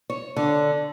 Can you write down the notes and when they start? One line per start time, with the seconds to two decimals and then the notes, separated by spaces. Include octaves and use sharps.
0.10 C#5
0.36 D3